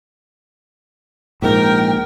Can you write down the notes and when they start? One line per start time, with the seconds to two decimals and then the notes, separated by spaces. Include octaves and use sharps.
1.42 A#1 G#2 A#4 G5